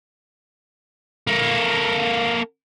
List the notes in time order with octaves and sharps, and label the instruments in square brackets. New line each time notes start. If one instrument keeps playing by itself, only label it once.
[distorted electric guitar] A#3 A4